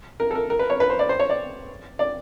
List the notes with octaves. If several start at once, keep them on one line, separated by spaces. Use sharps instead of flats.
A#4
A4
A#4
A#4
B4
C#5
B4
C5
D5
C5
C#5
D5
D5